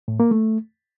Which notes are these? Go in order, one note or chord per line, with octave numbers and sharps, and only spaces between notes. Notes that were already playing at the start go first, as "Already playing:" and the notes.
A2
A#3
A3